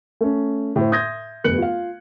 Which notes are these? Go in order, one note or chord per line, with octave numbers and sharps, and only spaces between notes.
A3 C#4
A2 C5
E5 C6 D#6 G6 G#6 A#6
F1 G2 B3 F#6 C#7 F#7
F4 F5